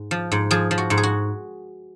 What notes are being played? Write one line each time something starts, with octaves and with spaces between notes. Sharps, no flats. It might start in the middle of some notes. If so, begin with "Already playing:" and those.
Already playing: G#2
F3
G#2
F3 G#4
F3
F#4
G#2
G#4
F#4